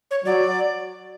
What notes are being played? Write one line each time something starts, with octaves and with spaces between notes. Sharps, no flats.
C#5
F#3 D5